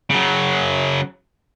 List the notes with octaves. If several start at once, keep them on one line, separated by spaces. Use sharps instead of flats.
C#3 F#3